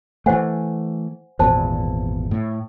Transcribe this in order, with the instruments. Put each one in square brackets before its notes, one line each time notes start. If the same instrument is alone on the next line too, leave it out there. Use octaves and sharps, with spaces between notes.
[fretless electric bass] E3 A3 [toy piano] C5 F#5 G#5
[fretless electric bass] G#1 E2 A#2 [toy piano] C5 A5
[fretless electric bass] A2